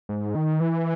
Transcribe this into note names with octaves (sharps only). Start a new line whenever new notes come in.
G#2
D#3
E3